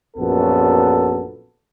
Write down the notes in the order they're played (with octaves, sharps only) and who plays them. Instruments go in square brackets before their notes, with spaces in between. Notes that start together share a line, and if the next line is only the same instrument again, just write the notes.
[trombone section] A#1 F#2 F#3 B3 A4